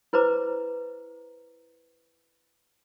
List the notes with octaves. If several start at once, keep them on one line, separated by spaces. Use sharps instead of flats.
E4 B4 C5 A#5 D6